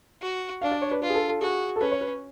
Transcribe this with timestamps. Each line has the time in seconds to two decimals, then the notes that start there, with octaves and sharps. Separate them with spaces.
0.22 F#4
0.62 D4 F5
0.72 D5
0.82 C#5
0.91 B4
1.01 F4 B4
1.10 G#4
1.15 A4
1.28 A4
1.41 F#4 G#4
1.76 A4
1.81 C#4 B4
1.91 C#5
2.01 B4